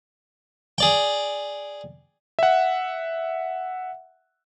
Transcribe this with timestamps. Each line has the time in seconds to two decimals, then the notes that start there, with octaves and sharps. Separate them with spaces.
0.78 G#4 D5 G5
2.39 E5 F#5